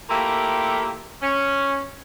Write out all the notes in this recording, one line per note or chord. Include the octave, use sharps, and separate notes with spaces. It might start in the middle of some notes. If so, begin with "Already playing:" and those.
A3 A#3 E4 F4 G4 A4
C#4